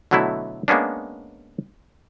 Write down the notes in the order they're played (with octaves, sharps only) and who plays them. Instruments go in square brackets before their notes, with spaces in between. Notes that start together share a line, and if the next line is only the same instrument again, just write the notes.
[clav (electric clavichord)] B2 D3 F#3 A3 E4
G#3 A#3 B3 C#4 D4